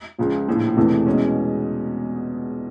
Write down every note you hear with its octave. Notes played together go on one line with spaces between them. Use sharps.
C#2 C#3 F3
A#1 A2 F3
E1 E2 C3 E3 A3
E2 B2 G#3 C#4